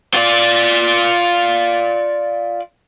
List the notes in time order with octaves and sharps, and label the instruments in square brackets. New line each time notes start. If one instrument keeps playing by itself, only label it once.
[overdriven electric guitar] F4 D5